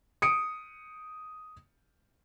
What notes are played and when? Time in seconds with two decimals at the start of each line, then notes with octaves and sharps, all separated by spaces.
0.22 D#6 C#7 D7